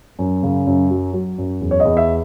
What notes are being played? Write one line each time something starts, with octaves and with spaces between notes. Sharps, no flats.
F#2
C#3
F#2
F#3
F#3
F#2
E2
C#5
D#5
E2
E5